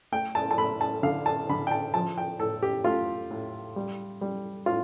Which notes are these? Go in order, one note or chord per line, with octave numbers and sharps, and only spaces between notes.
A3 G5
A5
A5
A3 B5
A5
D3 F5
A5
D3 B5
G5
A5
F3 A5
G5
A2 A4
G4
A3 F4
A2
G3
G3
A2 F4